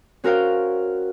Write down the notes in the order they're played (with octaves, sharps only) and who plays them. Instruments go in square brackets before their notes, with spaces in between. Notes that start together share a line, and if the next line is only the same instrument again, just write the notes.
[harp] C#4 F#4 A#4 C5 F5 G5